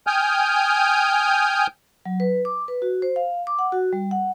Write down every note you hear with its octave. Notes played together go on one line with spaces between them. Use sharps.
G5 G#5 D#6 F6 G6
F#3
B4
D6
B4
F#4
C5
F5
D6
F#5
F#4
G3
F#5